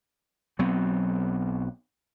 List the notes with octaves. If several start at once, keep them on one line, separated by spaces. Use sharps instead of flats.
B1 F#3 B3 C4